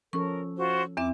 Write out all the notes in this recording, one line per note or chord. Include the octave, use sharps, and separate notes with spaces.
F3 C#4 A4 A#4 C#6
F4 F#4 C5
E2 C4 E4 E5 D6